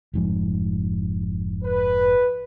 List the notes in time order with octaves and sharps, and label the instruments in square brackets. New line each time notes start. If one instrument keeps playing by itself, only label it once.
[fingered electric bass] F1 G#2 F3
[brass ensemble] B4